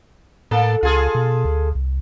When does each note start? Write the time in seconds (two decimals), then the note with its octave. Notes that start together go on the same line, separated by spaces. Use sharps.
0.51 A2 A#3 A4
0.83 C#2 F4 G#4 A4
1.15 B2
1.45 D2
1.75 C2